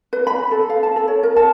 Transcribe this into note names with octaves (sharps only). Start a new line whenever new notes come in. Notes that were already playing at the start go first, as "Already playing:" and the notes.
B4
B5
A4
F5
A5
A4
C#5
A#4
A5